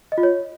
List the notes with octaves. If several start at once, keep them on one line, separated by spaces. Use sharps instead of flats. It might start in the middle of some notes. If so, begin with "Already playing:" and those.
D#5
F4
C#5